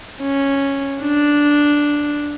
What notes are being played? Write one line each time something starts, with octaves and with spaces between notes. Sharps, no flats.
C#4
D4